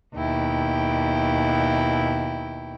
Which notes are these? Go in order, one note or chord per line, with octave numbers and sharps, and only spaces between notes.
D#2 B2 E4 G5